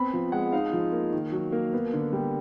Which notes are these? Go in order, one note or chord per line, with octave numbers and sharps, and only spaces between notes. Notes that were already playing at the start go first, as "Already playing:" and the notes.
Already playing: B3 C4 B5
F3
G#3 F#5
D#4 F5
F3
A#3
D#3
F#3
A#3
B3
D3
G3